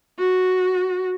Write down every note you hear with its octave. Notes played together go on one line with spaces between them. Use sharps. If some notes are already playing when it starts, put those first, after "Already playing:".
F#4